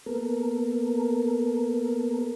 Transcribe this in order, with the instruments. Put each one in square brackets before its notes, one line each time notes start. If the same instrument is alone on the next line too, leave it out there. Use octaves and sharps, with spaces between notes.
[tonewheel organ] A#3 B3 A4 A#4